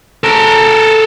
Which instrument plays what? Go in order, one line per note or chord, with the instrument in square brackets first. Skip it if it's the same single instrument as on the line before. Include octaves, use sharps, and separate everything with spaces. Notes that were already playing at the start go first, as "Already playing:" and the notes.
[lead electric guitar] A4 A#4